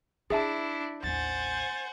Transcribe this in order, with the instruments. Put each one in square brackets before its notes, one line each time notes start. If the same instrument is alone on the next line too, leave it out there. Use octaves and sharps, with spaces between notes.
[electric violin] D4 E4 [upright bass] F4 [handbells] G#4 E5 A5
[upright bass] A1 D#2 [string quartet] C5 F#5 G#5 [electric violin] A6